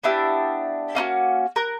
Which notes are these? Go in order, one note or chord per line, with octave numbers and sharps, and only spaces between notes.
B3 D4 E4 G4
A#3 C#4 D#4 F#4
A#4 F#6